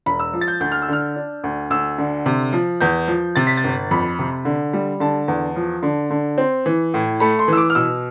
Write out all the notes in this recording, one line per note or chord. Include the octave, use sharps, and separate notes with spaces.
E1 B5
E6
F3
A6
G6
D2 G6
F6
E6
D3 F6
D4
D2
D2 E6
D3
C3
F3
E2 G6
F3
C3 A6
B6
A6
G1
F2 B5
C3
D3
G3
D3 A5
E2
F3
D3
D3
C4
E3
A2
A3 B5
C6
E3 E6
D6
F6
B2 E6